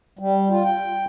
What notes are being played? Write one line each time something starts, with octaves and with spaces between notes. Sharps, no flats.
G3
F4
G5